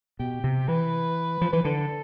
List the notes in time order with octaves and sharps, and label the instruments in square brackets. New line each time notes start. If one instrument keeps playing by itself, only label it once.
[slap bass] B2 [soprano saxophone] G4
[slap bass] C3
[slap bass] E3 [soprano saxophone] B4
[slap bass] F3
[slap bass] E3 [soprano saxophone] B4
[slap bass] D3 [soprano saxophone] A4